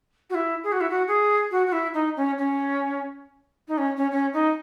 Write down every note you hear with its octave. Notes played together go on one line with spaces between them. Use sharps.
F#4
E4
G#4
F#4
E4
F#4
G#4
F#4
F#4
E4
D#4
C#4
C#4
D#4
C#4
C#4
C#4
D#4